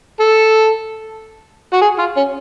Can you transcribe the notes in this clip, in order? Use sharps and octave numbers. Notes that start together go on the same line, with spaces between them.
A4
F#4
G#4
F4
C#4